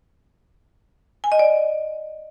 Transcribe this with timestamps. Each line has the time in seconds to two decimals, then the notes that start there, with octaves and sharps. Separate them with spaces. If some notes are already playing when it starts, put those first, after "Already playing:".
1.24 G#5
1.32 D#5
1.39 D5